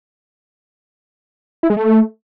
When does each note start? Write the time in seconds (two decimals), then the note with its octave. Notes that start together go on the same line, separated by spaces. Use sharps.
1.63 E4
1.70 G#3
1.77 A3